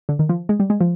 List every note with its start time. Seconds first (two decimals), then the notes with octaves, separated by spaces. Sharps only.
0.09 D3
0.19 D#3
0.29 F3
0.49 G#3
0.60 G3
0.70 G#3
0.81 F3